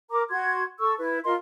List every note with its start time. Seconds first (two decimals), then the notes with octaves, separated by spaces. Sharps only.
0.10 A#4 A#5 D6
0.30 F#4 C6 G#6
0.79 A4 C#6 E6
0.98 E4 B4
1.25 F4 A#4 D#5 C6